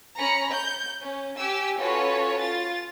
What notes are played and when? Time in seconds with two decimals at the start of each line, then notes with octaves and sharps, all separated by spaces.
0.17 C#4 A#5 B5 C#7
0.51 G6
1.01 C#4
1.37 G4 G#5 E6
1.78 C#4 F4 F#4 A4 B4 C#5
2.40 F4 A6